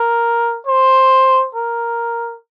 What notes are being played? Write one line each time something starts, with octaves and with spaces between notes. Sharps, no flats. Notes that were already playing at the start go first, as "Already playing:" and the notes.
Already playing: A#4
C5
A#4